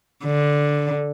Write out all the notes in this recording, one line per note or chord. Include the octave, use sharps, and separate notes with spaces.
D3